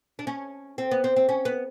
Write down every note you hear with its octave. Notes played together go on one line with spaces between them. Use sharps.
D4
C#4
C4
B3
C4
C4
C#4
B3